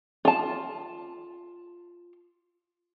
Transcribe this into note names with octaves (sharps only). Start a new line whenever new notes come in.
F4 A5